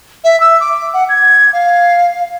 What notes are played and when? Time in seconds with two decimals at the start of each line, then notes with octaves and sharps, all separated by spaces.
0.24 E5
0.40 E6
0.60 D6
0.94 F#5
1.09 G#6
1.53 F5